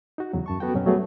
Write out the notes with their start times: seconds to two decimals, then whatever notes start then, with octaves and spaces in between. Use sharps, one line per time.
0.18 D#4 F#4
0.33 E2 C#3 F#3
0.46 F#2 A5 C#6
0.60 B3 F#4 A4 F#5 G5
0.74 F#2 B2 F#3 C#4
0.87 F#3 G3 A3 B3 G#4